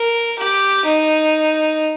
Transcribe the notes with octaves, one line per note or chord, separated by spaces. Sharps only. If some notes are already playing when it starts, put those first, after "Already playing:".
Already playing: A#4
G4
D#4